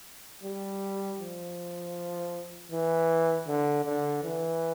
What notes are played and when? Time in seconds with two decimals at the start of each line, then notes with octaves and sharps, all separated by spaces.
0.43 G3
1.20 F3
2.71 E3
3.48 D3
3.85 D3
4.24 E3